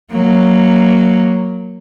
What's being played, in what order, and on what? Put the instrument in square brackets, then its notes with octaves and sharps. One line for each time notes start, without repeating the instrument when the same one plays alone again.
[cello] F#3 A#3